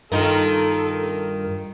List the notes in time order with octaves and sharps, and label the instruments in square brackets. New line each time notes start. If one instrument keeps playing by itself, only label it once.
[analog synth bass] G2 [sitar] D#3 D#4 F4 [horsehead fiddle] A4 [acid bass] A#4